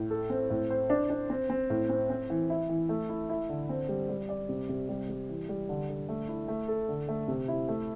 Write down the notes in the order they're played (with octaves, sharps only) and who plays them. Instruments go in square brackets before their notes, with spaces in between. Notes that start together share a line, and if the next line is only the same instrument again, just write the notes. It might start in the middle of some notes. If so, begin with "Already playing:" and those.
Already playing: [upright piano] A2
A4
C4
A2
C5
D4
D4
C4
C4
A2
C4
C4
E3
E4
E3
A3
E4
E4
D3
C4
G3
G3
D5
C3
C3
G3
G3
E3
G3
D3
D3
A3
E4
A3
A4
D3
A3
C3
E4
A3